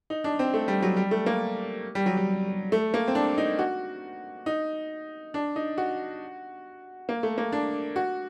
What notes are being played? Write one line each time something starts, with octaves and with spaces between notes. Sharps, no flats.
D#4
D4
C4
A3
G3
F#3
G3
A3
A#3
G3
F#3
G3
A3
A#3
C4
D4
D#4
F#4
D#4
D4
D#4
F#4
A#3
A3
A#3
D4
F#4